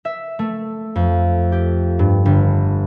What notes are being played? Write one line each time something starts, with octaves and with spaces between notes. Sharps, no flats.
E5
A3
F2
G4
G2
G1